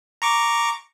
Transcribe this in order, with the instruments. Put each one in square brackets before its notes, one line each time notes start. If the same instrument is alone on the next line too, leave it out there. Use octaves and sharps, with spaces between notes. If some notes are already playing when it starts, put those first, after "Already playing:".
[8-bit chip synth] A#5 C#6 D6